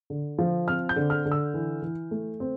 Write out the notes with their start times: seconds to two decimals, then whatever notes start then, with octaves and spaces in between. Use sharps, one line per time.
0.10 D3
0.39 F3
0.68 C4 F6
0.89 G6
0.96 D3
1.10 F6
1.26 D3
1.32 E6
1.54 E3
1.82 E3
2.11 A3
2.40 C4